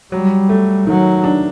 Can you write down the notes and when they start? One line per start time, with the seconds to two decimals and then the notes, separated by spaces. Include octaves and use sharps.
0.12 F#3 G3
0.49 A3
0.87 D#3 F#3
1.24 D4